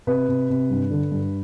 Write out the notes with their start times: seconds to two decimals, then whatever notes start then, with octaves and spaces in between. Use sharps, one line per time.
0.07 C3 B4
0.28 C3
0.50 C3
0.70 G2
0.90 D3
1.11 G2